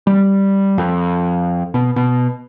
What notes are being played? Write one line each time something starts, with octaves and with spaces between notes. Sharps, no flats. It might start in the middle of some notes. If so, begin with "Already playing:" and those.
G3
F2
B2
B2